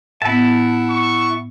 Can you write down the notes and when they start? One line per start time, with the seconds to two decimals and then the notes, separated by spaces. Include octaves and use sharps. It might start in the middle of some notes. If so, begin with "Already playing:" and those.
0.22 A2 B3 E4 E5 F#5 A5
0.90 C#6